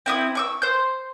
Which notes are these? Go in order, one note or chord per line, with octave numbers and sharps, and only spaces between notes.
C4 E4 D#6
C#6 D6 E6
C5 G6